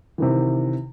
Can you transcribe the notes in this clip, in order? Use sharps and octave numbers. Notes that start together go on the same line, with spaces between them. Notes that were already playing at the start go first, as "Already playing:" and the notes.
C3 D#3 E3